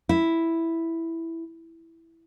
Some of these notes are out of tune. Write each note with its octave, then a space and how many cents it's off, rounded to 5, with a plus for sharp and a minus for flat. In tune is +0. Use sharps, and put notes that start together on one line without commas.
E4 +0